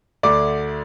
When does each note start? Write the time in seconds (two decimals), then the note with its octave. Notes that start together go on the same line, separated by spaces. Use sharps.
0.23 D2 D3 A3 D5 D6